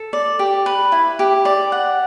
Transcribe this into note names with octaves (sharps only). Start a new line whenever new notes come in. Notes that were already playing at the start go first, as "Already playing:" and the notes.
Already playing: A4
D5
G4
B4
E4
G4
D5
F#5